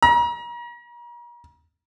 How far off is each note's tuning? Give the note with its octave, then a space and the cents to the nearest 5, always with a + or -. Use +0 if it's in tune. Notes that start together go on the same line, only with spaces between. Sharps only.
A#5 +40